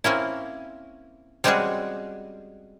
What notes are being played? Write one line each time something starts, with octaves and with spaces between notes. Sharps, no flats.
A#3 C4 C#4 E4
G3 G#3 C4 C#4 F#4 G#4